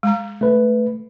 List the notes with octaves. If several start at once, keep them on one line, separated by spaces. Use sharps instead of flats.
G#3 F5 A#5
A3 B4